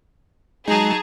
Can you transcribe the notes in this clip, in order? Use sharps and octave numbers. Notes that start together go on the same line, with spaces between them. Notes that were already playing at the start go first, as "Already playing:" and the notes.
F#3 G#3 D#4 G#4 A5 A#5